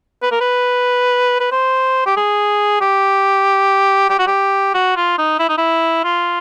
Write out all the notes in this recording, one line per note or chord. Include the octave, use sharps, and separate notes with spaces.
B4
A#4
B4
B4
C5
G4
G#4
G4
G4
F#4
G4
F#4
F4
D#4
E4
D#4
E4
F4